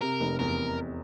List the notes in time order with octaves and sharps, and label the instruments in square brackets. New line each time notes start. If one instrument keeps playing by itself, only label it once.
[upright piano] C3 [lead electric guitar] A#4
[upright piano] F1
[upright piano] E2 [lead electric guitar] A#4